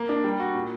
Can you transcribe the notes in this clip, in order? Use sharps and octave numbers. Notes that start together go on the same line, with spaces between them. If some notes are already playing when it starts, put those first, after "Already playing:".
Already playing: A#3
D4
G3
F#4
A#2